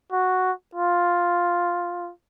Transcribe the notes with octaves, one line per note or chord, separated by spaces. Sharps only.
F#4
F4